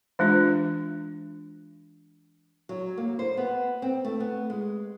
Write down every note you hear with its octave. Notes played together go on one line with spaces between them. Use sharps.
E3 G#3 D4 F4
F#3
A#3
C5
B3
C4
A3
B3
G#3